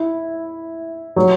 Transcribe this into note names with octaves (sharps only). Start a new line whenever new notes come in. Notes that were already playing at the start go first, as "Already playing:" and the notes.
Already playing: E4
F#3